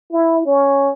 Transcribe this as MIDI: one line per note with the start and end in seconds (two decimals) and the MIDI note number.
0.12 0.41 64
0.46 0.90 61